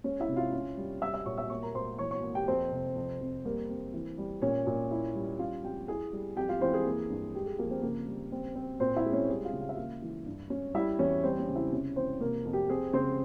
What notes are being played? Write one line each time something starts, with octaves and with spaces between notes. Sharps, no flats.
G#3 C#4 C#5
E4 E5
C3
F4 F5
C#4
G3
G3 E5 E6
E5 E6
A#2 C#5 C#6
E5 E6
A#3 C#5 C#6
A#4 A#5
A#2 C5 C6
E3 C#5 C#6
C#5 C#6
A#3
G4 G5
F2 C4 C5
C3
F2
F2
G3 A#3 A#4
C4
E3
G3
A#2 C#4 C#5
A#2
E4
G3
C#4 F4 F5
F2 G4 G5
E4 G#4 G#5
G3
F2 G4 G5
F4 F5
E3 C4 C5
G#4
A#3
G2
G#3 G4
G#4
F3 A#3 A#4
C4 C5
C#3 A#3 A#4
G3
C4
C4
A#2 C4 C5
E4 E5
G#3
C#4 C#5
G3 G#4
F4 F5
C#3
F5
E5
A#3 F4 F5
E3
G2
C#4
G3 E4 E5
E2 C#4 C#5
G3 C4 C5
C#4 C#5
C#3
E4 E5
C3 C#4 C#5
E3 C4 C5
C3 A#3 A#4
F2
G4
C4 G#4
C#3 C4 C5